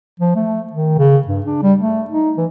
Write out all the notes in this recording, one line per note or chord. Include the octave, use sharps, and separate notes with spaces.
F3
A3
D#3
C#3
G2
D4
G3
A3
D#4
E3